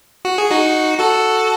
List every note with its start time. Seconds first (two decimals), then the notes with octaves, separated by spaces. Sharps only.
0.25 F#4
0.38 G#4
0.51 D#4 F#4
0.99 F#4 A4